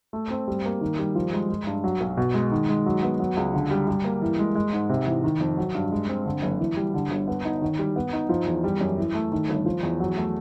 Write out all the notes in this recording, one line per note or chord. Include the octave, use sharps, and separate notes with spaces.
A3
C4
G3
A#3
D#3
G3
F3
G#3
G#3
G2
F#3
B1
B2
G#3
D#3
G#3
F#3
B3
F#3
C#2
D3
G3
G3
A#3
E3
G#3
G#3
G#2
C3
E3
D#3
F2
F#3
G2
G#3
C4
D3
F#1
E3
G3
D3
G1
B3
D#4
D#3
G3
B3
D#4
F3
E2
G3
F#2
E3
A3
D#3
G1
F3
E2
F#3
A3